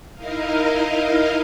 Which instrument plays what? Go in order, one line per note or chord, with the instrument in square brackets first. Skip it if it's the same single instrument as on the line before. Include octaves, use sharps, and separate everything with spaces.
[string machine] D#4 E4 A#4 D#5 F5